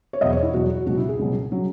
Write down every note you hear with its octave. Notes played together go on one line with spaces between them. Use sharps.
C#5
E2 B2 F#3 D#5
C#5
E4
E2 B2 F#3 F#4
F#4
C#2 B2 F#3 F#4
E4
G#4
C#2 B2 F#3
C#3 F#3